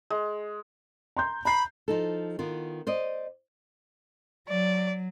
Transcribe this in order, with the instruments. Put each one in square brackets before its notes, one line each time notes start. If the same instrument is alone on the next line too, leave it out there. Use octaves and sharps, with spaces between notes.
[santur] G#3
[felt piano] A#5 C6 G6
[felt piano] A#5 C7 [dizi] B5
[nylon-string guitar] F3 D#4 A4
D#3 B3 F4
C5 D5 D#5
[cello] F#3 [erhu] D5